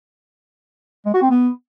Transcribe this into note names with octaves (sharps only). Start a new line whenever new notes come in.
G#3
F#4
C4
B3